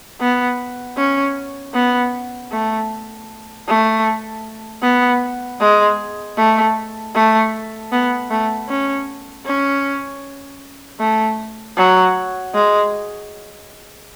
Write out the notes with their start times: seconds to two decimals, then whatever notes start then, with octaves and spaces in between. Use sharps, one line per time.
0.20 B3
0.97 C#4
1.74 B3
2.51 A3
3.68 A3
4.83 B3
5.60 G#3
6.38 A3
7.15 A3
7.92 B3
8.30 A3
8.69 C#4
9.45 C#4
11.00 A3
11.77 F#3
12.54 G#3